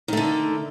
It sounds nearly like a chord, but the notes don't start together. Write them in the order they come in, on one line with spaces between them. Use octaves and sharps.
D#3 A3 D3